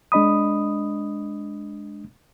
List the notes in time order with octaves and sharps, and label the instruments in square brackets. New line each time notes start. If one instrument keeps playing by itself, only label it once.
[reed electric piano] G#3 D4 D#5 B5 D#6